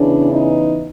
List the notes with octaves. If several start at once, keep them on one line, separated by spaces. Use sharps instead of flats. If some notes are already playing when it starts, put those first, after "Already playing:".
Already playing: E2 C#3 E3 D4
D#4